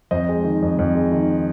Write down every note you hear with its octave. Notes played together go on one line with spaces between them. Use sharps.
F2 C5 D#5
G#3
D#3
F2
F2
G#3
D#3